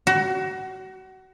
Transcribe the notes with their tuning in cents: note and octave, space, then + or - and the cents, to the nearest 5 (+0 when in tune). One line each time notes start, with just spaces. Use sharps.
F#4 +30